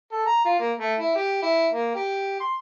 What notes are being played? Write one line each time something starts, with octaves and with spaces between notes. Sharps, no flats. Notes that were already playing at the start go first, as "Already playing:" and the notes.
A4
A#5
F4
A#3
A3
E4
G4
E4
A#3
G4
C6